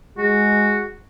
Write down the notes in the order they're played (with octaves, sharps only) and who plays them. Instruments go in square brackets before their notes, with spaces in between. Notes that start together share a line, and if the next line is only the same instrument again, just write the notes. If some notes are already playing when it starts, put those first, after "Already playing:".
[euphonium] G#3 [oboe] F#4